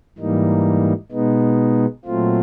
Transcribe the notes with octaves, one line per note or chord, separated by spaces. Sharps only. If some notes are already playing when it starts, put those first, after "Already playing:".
G#2 E3 G3 A#3 D#4
B2 G#3 B3 D#4
A#2 F#3 A3 C4 F4